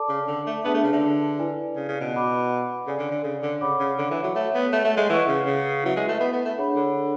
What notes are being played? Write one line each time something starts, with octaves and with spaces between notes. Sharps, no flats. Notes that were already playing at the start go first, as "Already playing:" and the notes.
Already playing: A4 D5 A5 D6
C#3
D3
A3
B3 D4 G#4 B4 E5 A5
A3
C#3
D3
E4 B4 D5 G#5
C#3
C#3
B2
F#4 B4 F#5 B5 D6
C#3 A4 D5 G#5
D3
D3
C#3
D3
C#3 C#5 F#5 B5 D6
C#3
D3
E3
F#3
A3 A4 C#5 F#5
B3
A3
A3
G#3
E3 B4 F#5 C#6
C#3
C#3
F#3 E4 B4 E5
G#3
A3
B3
B3
A3
D4 G#4 C#5 F#5 B5
D3